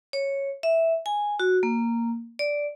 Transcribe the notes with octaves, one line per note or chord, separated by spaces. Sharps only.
C#5
E5
G#5
F#4
A#3
D5